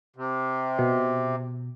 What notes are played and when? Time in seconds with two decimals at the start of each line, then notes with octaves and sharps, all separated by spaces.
0.16 C3
0.79 B2